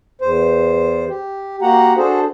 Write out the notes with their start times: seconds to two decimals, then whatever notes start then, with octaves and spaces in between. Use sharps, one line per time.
0.21 E2 C5
1.09 G4
1.62 A#3 F#4 G4 F#5 A#5
1.97 D4 F#4 G#4 A4 C5